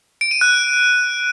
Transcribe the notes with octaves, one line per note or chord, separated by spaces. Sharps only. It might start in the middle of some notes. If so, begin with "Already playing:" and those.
D7
D#7
F#6